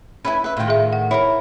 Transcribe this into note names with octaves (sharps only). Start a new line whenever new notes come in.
C#4 E4 B4 E5 G#5
B4 E5
A2 D#3 F4 G5
G#4 E5
F#5
E4 G#4 A#4 C#5